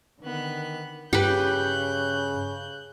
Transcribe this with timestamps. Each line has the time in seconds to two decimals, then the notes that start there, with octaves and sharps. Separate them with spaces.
0.22 D3 D#3 B3 F#6
1.13 G2 C#3 G4 B4 F#6 G6